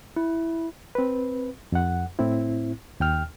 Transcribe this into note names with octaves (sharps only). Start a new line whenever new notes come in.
E4
C4 B4
F2 F#5
A2 C4 E4
D#2 G5 F6